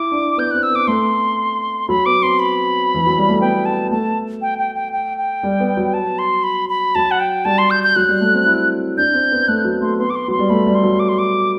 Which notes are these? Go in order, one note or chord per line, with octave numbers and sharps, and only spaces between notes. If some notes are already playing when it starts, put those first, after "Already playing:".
Already playing: E4 D6
D4
B3 G6
C4 F#6
E6
B3 D6
A3 C6
F#3 B5
B3 D6
C4 C6
B5
E3
F#3
G3
A3
B3 G5
A5
A3 A5
G5
G5
G5
G5
G5
G3
B3
F#3
A5
C6
B5
B5
F#3 A5
F#5
G5
G3 A5
C6
G6
G6
F#3 F#6
G3
A3
C4
E4
D4 G6
C4
B3
A3 F#6
F#3
A3 C6
B3 C6
D6
C6
F#3 C6
G3
A3 B5
G3
C6
F#3
D6
C6
D6